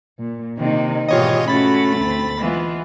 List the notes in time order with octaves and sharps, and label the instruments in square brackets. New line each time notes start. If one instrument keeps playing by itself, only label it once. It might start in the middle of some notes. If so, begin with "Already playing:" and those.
[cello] A#2
[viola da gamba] C3 A#3 [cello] D#3 D#4
[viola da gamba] G#2 B2 E3 [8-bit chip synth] F4 C#5 D#5 [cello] G4
[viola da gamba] A3 [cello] C#4 F#4 [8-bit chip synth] B5 A6
[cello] D2 C4
[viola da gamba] E3 B3 F4 [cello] G#3